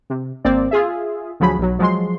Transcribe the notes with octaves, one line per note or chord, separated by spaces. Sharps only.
C3
G#1 A#3 C4 D5
F4 G#4 E5
D2 F3 F#3 G#4 B5
B1 F#3
F3 F#3 G#3 C6